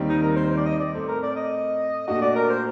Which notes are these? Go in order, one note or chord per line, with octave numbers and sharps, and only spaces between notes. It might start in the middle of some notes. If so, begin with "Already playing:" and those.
Already playing: D#2 D#3 G3 C4
D#4
A#4
C5
C5
D5
D#5
D5
A2 A3 C4 C5
A#4
D5
D#5
A#2 A3 D4 F#4 D#5
D5
A#4
C5